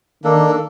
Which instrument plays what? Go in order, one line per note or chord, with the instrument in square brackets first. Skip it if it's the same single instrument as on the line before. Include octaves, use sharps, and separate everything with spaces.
[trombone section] D#3 [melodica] A#3 D4 A4